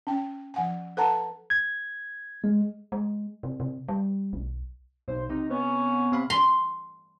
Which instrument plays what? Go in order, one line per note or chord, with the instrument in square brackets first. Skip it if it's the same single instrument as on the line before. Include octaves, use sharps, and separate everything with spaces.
[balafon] C#4 G5
F3 F#5 G#5
A4 B4 F#5 A5 A#5
[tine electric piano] G#6
G#3
[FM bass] G#3
C3
C3
G3
B1
[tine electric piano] B1 [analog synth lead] C5
[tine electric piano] C3 [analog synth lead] D#4
[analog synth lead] B3 [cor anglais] C#4
[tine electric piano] C3 F5 B5
[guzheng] C6